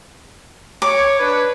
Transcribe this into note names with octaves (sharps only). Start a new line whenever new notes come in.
C#5 D6
D4 B4